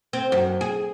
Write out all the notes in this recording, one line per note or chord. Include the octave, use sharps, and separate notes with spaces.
C4
F#2
G#4